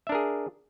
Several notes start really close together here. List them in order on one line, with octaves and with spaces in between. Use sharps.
E5 D4 A#4 G#4